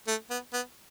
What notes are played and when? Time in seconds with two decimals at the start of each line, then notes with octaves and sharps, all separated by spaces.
0.07 A3
0.30 B3
0.53 B3